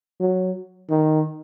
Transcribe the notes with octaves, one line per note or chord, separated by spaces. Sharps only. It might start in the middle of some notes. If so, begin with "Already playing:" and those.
F#3
D#3